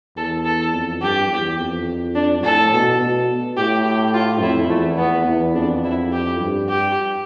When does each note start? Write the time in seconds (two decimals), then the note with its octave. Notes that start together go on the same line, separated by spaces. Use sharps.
0.17 E2 A4
0.45 A4
0.73 F2
1.01 G2 G4
1.30 E2
1.58 F2
2.15 D4
2.43 A2 A4
2.72 B2
2.99 B2
3.56 A2 G4
3.84 G4
4.13 F4
4.41 F2 E4
4.70 E2 A3
4.98 B3
5.27 E2
5.54 F2 D4
5.84 E4
6.12 G4
6.40 G2
6.69 G4